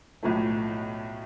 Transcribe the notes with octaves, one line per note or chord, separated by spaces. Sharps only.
B1 A2 F3 A3